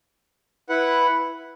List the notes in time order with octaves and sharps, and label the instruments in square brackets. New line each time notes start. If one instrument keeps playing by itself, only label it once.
[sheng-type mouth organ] E4 B4 F#5